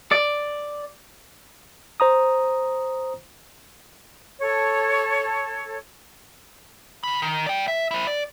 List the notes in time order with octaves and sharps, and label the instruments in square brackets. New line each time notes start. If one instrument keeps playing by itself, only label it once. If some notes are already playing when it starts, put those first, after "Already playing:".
[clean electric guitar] D5
[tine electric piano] C5 A#5 D#6
[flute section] A4 C#5
[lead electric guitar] C#3 B5
D#3
D5 G5
E5
E4 C5
D5